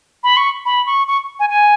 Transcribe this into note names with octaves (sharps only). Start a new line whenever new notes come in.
B5
C#6
B5
C#6
C#6
G#5
G#5